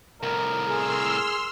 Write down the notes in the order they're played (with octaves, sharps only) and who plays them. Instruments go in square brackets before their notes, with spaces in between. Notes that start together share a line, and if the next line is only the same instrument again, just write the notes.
[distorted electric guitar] C2 A2 [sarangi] A#4
[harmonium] G#4 [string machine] C6 E6 F6